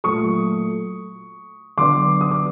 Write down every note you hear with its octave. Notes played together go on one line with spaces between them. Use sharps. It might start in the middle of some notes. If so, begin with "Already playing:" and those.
A#2 F#3 A3 C#6 D#6
D3 F#3 B3 D4 C6 D6
D#6
D6